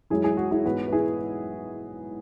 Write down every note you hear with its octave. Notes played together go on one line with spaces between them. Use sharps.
F#2 E3 G#3 E4 G#4
E4 G#4
F#4
E4 G#4
G#2 E3 B3 F#4 B4
B4
E4 G#4